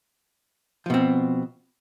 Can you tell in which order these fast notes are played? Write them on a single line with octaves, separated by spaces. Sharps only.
F3 B2 C4